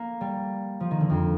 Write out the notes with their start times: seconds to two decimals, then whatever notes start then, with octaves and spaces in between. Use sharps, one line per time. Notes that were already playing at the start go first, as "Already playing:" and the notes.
Already playing: A#3
0.21 G3
0.80 F3
0.91 D#3
1.00 D3
1.10 F2